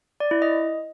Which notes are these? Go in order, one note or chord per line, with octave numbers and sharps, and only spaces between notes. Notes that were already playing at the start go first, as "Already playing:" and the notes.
D5
E4
D#5